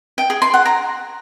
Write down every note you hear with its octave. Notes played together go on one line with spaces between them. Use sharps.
G5
G#4
C6
F#5
A#5